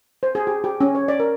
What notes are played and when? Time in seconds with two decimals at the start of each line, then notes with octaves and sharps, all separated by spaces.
0.23 C5
0.35 G#4
0.47 G4
0.64 G4
0.81 C#4
0.95 C#5
1.08 D5
1.20 A#4